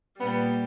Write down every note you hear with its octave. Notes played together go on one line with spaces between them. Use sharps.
A#2 G3 B3